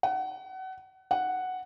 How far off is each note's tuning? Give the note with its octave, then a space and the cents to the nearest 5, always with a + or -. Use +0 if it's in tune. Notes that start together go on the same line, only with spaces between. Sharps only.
F#5 +30
F#5 +0